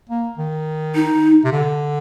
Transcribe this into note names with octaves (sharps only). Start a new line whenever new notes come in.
A#3
D#3
D#4
C3
D3